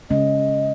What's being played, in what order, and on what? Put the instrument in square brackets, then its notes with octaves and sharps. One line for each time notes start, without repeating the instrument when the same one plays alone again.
[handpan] C#3 G#3 C#4 [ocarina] D#5